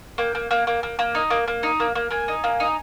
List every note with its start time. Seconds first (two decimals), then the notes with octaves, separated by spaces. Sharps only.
0.18 A#3 G5
0.35 A#3
0.51 A#3
0.67 A#3
0.83 A#3
0.99 A#3
1.15 D#4
1.30 A#3
1.48 A#3
1.63 D#4
1.80 A#3
1.95 A#3
2.11 A#3 G#5
2.28 D#4
2.44 A#3
2.60 D#4